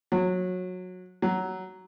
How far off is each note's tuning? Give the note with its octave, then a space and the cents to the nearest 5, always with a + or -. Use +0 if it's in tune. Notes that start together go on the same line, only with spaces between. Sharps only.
F#3 -20
F#3 +10